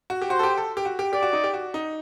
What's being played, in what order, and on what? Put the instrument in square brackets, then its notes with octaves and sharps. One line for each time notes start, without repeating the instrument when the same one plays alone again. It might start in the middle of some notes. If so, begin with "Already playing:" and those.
[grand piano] F#4
G4
[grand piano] F#4 [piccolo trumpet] C5
[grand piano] A4
G4
A4
G4
F#4
G4
[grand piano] G4 [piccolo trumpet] D5
[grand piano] F#4
D#4
G4
F#4
D#4